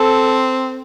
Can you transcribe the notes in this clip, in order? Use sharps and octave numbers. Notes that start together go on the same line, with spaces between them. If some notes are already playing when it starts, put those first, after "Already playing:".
Already playing: C4 A4